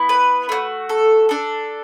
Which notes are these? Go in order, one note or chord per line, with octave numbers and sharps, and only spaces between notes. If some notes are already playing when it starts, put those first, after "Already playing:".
Already playing: B3 E4
B4
A3 D4 F#4
A4
D4 A4